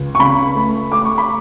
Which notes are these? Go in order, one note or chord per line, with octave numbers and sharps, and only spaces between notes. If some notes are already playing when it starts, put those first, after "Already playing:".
Already playing: C#2
C#6
C#3 B5
A3
A3 D6
C#6
B5